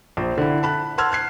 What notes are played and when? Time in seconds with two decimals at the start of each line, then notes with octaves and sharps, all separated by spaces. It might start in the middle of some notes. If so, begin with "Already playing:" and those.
0.17 A#1 C5
0.38 D3 E4
0.63 A5 B5 F#6
0.98 F#5 A5 C6 E6 F6 G#6
1.12 F#6 G#6 C7